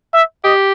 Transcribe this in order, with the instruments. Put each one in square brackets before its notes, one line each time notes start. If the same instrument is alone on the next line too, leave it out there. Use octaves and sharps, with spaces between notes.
[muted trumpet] E5
[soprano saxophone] G4 [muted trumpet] D#5